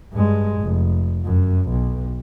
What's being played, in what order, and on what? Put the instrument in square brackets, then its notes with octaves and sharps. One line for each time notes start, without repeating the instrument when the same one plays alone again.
[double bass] G2 G#3
F1
F#2
B1